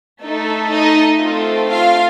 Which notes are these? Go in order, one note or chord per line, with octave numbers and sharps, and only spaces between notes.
A3 D#4 A4
D#4 D#5
A3 C4 F4 A4
F4 F5